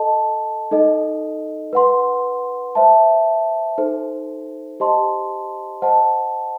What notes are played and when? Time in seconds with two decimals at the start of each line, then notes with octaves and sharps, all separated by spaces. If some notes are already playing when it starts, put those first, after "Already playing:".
Already playing: A4 D#5 A5
0.71 D#4 A4 D#5
1.73 B4 F#5 C6
2.75 C5 E5 A5
3.78 D#4 A4 C5
4.80 G4 C5 D#5 A5 C6
5.82 C5 D#5 F#5 A5